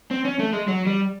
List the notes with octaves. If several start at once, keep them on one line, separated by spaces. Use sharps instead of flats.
C4
C#4
A3
G#3
F#3
G3